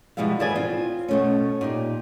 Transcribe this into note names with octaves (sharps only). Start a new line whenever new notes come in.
B2 F3 G3 G#3 E4 F5
B2 E3 A4 D5 D#5 G#5
C4 F4
B2 A3 C#4
A#2 D#4 G4